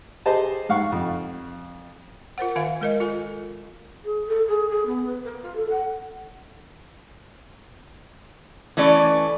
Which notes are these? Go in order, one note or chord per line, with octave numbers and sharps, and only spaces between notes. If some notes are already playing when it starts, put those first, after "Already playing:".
G4 G#4 C5 D#5 A5
G#2 F5 F#5 C#6
F2
F4 A#4 C5 F#5
D#3 E5 F5 G#5
G#3 A#4 D#5
F4 A4 G#5
G#4
A4
G#4
G#4
B3
B4
A#4
F4
A4
F#5
E3 A3 C#4 D5